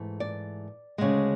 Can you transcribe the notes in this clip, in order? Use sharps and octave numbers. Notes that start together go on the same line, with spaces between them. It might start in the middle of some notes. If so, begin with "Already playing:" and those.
Already playing: G#2 E3 A3
D5
D2 C#3 G#3